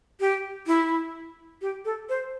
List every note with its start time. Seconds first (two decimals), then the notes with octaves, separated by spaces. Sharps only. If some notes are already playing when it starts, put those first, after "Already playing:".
0.20 G4
0.67 E4
1.61 G4
1.85 A4
2.09 C5